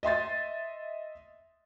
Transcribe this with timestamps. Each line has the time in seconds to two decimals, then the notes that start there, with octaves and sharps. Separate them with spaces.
0.03 D#5 E5 C6 A6